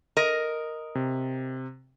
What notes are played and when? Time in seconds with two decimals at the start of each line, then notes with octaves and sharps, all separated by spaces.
0.17 A#4 D#5
0.95 C3